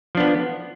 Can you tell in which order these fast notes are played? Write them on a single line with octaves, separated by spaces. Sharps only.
F3 D4 B3